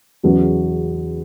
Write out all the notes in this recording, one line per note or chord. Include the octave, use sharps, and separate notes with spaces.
E2 C#3 F#3 B3